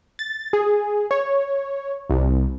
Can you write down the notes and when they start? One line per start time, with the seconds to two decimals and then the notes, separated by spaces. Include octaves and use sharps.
0.19 A6
0.53 G#4
1.11 C#5
2.10 C2